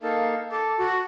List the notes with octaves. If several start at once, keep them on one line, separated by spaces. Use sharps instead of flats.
A#3 D#4 A4 F5
A4 D6
F#4